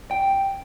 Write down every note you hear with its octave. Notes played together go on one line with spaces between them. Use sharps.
G5